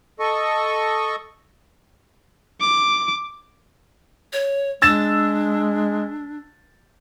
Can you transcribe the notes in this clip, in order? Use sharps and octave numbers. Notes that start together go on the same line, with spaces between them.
A4 D#5 C#6
D6
C#5
G#3 D4 E6 A6 E7